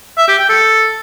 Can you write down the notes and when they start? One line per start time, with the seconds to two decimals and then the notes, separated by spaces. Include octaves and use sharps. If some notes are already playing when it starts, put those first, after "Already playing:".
0.18 E5
0.28 G4
0.39 G5
0.49 A4